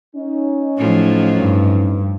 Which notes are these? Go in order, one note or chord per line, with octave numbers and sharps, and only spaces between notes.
C#4 D#4
A2 F3 F#3
G2